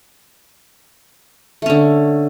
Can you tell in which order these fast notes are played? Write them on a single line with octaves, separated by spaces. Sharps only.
A3 C#4 D3